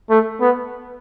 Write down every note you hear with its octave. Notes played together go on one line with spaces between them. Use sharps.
A3
B3